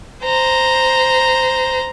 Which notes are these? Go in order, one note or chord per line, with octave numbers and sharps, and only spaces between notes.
C5 A#5